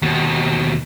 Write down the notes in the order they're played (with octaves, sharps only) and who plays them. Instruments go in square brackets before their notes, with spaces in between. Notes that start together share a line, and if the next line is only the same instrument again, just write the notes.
[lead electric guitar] D#2 B2